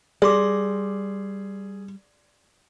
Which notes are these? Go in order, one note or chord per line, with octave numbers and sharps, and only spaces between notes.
G3 G#4 D5 C6 D6